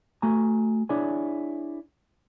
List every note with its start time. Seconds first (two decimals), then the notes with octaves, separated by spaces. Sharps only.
0.22 A3 F#4 G#5 A#5
0.89 D4 E4 G#4 C#5 D5 G#5